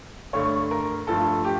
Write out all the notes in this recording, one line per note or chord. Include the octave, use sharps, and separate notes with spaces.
G2 D3 A3 C#5
A#4
G2 F3 A3 A4
G4